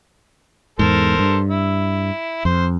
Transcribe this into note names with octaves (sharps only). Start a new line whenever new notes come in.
E2 G#2 A4 A#4 C5
G2
E4
F2 C5